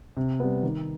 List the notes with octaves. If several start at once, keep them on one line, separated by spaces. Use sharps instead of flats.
C3
G3 B3
D#3